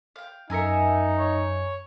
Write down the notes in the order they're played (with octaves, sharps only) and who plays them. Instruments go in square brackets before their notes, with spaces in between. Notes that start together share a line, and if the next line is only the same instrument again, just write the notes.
[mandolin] F5 G5
[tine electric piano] F#2 A#5 C#7 [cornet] D#4 [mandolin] A#4 E5 G#5
[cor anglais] C#5